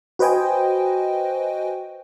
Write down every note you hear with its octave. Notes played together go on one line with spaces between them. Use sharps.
F#4 B4 C5 D#5 G5 G#5